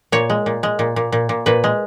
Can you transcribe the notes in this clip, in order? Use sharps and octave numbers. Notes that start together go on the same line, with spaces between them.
A#2 C#5
G#3
A#2
G#3
A#2
A#2
A#2
A#2
A#2 B4
G#3